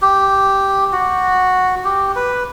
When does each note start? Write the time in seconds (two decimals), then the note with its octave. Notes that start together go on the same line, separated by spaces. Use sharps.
0.02 G4
0.93 F#4
1.84 G4
2.16 B4